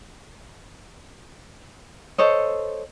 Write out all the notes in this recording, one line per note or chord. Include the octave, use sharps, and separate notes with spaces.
A4 C5 C#5 D#5